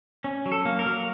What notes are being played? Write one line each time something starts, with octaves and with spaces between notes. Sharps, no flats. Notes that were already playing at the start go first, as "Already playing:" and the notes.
C#4
F#3
A4
A#3
A#4
F#3